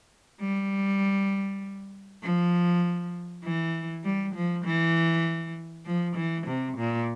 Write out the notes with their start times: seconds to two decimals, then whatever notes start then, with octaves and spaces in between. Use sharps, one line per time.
0.41 G3
2.23 F3
3.44 E3
4.04 G3
4.35 F3
4.65 E3
5.86 F3
6.16 E3
6.47 C3
6.77 A#2